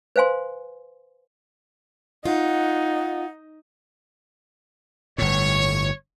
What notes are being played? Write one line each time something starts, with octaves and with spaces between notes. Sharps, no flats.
B4 C5 F5 G#5 C6
D#4 F4 F#5
G1 A2 C#5